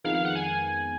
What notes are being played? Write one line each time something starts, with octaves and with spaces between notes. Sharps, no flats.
F2 D#3 G#3 B3 D#4 F5
F5
F#5
G#5